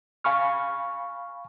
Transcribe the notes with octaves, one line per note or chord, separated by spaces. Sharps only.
F5 G#5 B5 C#6 F6